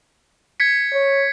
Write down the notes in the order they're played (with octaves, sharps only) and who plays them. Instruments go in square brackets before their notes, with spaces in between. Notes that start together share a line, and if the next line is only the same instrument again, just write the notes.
[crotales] G#6 B6 C#7
[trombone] C#5